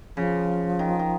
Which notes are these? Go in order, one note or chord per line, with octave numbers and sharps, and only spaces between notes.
C#3 F3
D#3
D#3